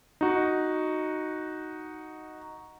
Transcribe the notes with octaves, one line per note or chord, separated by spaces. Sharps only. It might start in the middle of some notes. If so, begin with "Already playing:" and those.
D#4 F#4